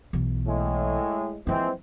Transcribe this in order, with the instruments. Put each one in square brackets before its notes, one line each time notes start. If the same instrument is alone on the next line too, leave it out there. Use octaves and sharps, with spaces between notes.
[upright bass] B1 E3
[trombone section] A2 G#3
[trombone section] E3 G#3 C4 [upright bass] F3 A#3